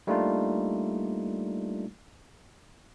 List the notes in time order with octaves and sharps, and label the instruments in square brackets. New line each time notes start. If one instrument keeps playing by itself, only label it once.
[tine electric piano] G3 A3 A#3 D4 D#4 F4